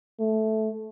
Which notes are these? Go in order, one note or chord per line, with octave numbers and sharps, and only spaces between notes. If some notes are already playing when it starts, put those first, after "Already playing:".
A3